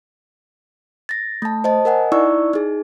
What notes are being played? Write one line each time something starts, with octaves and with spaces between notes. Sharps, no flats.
A6 A#6
A3 A5
C5 D#5 A5
A#4 D#5 F#5 G#5
D#4 E4 D5 C#6 E6
D#4 G#4